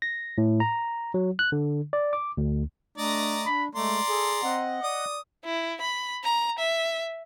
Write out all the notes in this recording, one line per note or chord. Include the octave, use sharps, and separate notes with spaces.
A#6
A2
A#5
F#3
F#6
D3
D5
D6
D2
A3 D4 D5 D#5 A#5
D4 B5
G#3 A3 D5 A#5 C6
G#4 A4
C4 D#5 F#5
D5 D#6
E4
B5
A#5
E5